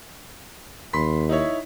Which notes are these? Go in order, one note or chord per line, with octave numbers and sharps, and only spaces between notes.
D#2 B5 C6 B6
D#4 E4 C#5